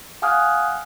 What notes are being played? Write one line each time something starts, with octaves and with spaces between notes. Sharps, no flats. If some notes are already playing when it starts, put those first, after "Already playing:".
F5 F#5 G#5 D#6 F6 F#6